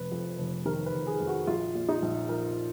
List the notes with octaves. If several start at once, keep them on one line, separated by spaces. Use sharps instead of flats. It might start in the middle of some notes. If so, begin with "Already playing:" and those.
Already playing: F1 B4
F2
F1
D#3 A#4
B4
F1
G#4
F2
F#4
A#1 F4
A#2
D#4
A#1
F3 A#4